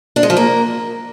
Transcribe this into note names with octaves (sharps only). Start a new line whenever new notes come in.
D4
G#3
F3
A#3